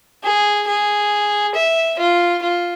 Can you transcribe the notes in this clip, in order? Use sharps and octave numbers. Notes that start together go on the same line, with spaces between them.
G#4
G#4
E5
F4
F4